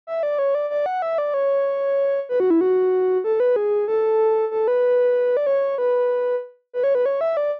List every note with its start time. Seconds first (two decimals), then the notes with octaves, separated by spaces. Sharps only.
0.07 E5
0.23 D5
0.39 C#5
0.55 D5
0.70 D5
0.86 F#5
1.02 E5
1.18 D5
1.34 C#5
2.29 B4
2.40 F#4
2.50 E4
2.61 F#4
3.24 A4
3.40 B4
3.56 G#4
3.88 A4
4.51 A4
4.68 B4
5.37 D5
5.46 C#5
5.78 B4
6.73 B4
6.84 C#5
6.95 B4
7.06 C#5
7.21 E5
7.37 D5